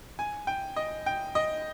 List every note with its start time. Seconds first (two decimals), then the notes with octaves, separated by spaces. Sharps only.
0.19 G#5
0.47 G5
0.76 D#5
1.06 G5
1.35 D#5